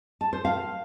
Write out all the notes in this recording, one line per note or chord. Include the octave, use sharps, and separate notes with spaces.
A5
C5
F5